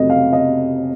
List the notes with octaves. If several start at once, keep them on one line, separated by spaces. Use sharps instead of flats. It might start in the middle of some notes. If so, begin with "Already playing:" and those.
Already playing: F2 C3 F#3 A3 C4 D#5
F5
D#5